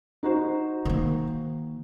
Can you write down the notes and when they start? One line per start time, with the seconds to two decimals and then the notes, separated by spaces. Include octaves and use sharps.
0.23 D#4 F#4 C5
0.85 D#3 A#3